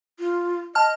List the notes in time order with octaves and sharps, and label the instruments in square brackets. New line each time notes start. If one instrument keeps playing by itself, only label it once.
[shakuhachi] F4
[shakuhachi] D#5 [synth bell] A5 F6